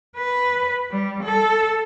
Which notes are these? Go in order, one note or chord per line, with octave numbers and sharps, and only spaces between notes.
B4
G3
A4